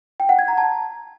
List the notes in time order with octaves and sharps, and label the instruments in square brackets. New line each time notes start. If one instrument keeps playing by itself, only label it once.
[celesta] G5
F#5
G#6
A#5
A5